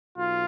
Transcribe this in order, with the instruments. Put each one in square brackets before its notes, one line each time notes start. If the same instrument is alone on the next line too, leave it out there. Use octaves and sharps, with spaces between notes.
[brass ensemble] B1 F4